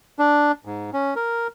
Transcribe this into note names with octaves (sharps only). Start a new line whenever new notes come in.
D4
G#2
C#4
A#4